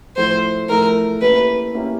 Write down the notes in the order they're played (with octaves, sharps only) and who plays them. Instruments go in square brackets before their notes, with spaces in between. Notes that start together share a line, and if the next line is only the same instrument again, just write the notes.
[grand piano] A2 F3 A3 [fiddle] C5
[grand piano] A2 F3 A3 [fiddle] A#4
[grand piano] A#3 C#4 E4 G4 [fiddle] B4
[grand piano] A#3 C#4 E4 G4